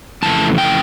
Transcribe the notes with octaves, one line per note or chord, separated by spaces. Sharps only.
F2 C#3 E3 A3 A5
G5